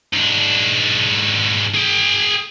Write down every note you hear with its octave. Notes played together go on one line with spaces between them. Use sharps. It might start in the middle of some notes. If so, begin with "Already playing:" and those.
G#2 D4
G#4 G5